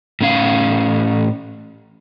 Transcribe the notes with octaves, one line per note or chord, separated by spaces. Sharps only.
A2 C#4 F5